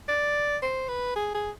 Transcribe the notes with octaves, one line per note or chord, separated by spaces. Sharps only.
D5
C5
B4
G#4
G#4